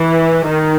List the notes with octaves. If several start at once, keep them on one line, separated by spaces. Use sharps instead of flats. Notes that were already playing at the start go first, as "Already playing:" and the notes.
Already playing: E3
D#3